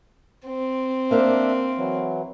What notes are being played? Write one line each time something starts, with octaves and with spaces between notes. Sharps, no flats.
C4
A#3 D4 A#4 C5 E5
E3 F#3